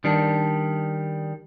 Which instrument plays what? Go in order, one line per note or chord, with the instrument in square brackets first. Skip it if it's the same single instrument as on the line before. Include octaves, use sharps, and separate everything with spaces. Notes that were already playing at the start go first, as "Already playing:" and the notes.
[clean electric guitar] D#3 G3 D4